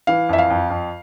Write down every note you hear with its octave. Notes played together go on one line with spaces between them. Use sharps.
E3 F5
F2 E5
F5
F2
F2